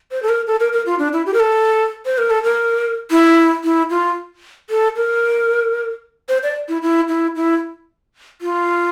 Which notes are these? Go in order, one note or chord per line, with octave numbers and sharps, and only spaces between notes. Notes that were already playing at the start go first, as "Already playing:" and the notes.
C5
A4
A#4
A4
A#4
A#4
F4
D4
E4
G4
A#4
A4
C5
A#4
A4
A#4
E4
E4
F4
A4
A#4
C5
D5
E4
E4
E4
E4
F4